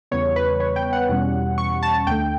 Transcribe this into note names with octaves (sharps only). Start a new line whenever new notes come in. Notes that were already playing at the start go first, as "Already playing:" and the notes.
E2 C#3 G3 B3 C#5
B4
C#5
G5
F#5
E2 B2 G3 C#4
C#6
A5
D2 D3 A3 G5